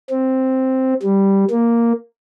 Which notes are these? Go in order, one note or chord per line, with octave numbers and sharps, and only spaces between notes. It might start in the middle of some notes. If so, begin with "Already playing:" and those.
C4
G3
A#3